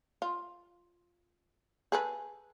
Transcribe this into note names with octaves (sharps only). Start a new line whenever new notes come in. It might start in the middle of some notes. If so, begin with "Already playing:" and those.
F4
G#4 A4 B4